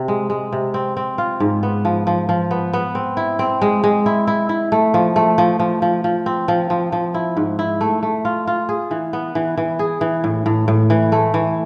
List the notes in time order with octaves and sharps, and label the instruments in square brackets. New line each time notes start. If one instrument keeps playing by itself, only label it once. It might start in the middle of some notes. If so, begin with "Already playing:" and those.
Already playing: [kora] C3 C4
G#3
G#3
C3
C4
C4
F4
G#2
B3
F3
F3
F3
B3
B3
C4
E4
C4
G#3
G#3
E4
E4
E4
A3
F3
A3
F3
F3
F3
F3
C4
F3
F3
F3
E4
G#2
E4
A3
A3
F4
F4
G#4
E3
B3
E3
E3
G#4
E3
A2
A2
A2
E3
A3
E3